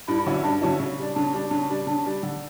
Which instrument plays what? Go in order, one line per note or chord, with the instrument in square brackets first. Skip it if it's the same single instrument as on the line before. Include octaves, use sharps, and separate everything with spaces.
[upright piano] G2 [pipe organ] E4
[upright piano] D3 F#3 C#4 E4
[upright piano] G2 [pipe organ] D4
[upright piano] D3 F#3 C#4 E4
C#3
G3 D4
[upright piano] C#3 [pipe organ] D4
[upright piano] G3 D4
[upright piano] C#3 [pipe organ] D4
[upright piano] G3 D4
[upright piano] C#3 [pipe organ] D4
[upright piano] G3 D4
D3